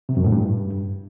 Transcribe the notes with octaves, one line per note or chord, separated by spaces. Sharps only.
C3
F#2
A2
G2